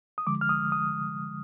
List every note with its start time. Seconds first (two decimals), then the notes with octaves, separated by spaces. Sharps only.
0.18 D#6
0.27 D3 F3 G#3 D6
0.41 F6
0.49 D#6
0.72 D#6